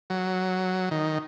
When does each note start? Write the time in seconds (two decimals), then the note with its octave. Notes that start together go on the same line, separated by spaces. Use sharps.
0.10 F#3
0.91 D#3